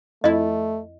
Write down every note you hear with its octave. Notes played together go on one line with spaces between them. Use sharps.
F2 A3 E4 D#5